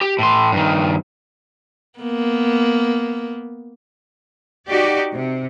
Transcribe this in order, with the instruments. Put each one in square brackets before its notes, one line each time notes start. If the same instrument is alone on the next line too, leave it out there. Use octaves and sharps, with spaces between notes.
[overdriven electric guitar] G4
A2 C6
G2 D#3
[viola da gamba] A#3 B3
[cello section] D#4 F#4 G4 D5
C3